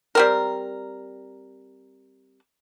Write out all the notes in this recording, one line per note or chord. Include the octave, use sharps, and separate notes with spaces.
G3 C4 A#4